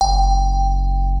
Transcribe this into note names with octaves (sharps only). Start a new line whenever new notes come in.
F#1 G5